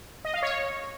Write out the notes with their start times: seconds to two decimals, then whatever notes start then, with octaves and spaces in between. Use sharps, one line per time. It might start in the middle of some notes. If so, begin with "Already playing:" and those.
0.25 D#5
0.34 F5
0.42 C#5